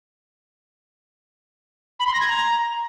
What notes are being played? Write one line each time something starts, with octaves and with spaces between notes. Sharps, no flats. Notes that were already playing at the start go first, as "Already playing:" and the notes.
B5
C6
A#6
G#6
A#5